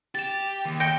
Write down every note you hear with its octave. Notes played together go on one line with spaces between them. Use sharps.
G4 A6 E7
D#2
G5 A#6 C#7 G7